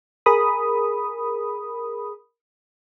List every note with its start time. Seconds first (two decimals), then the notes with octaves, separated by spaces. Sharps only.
0.26 G#4 A#4 B5 D#6